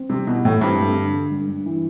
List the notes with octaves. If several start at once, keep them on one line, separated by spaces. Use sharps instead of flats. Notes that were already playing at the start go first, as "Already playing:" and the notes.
Already playing: C4
C3 G3
B2 E4
A2 E4
G2 C4
A3
D3
D3
G2
G2
E3